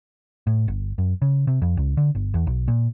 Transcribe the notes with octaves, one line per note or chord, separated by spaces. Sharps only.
A2
G1
F#2
C#3
C3
F2
C#2
D3
G1
E2
B1
A#2